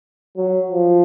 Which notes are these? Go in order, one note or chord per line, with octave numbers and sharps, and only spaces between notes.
F#3
F3